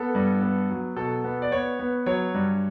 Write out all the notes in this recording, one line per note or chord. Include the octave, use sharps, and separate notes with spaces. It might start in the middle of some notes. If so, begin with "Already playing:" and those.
Already playing: B3 A4
G2
B3
F#3
B2 A4
B3
D5
B3 C#5
B3
F#3 C#5
G2